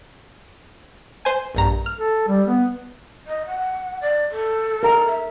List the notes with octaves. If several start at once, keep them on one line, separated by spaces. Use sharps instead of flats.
C5 G#5
A#1 G2 A#5
F6
A4
G3
B3
D#5
F#5
D5
A4
A#4 A#5
E5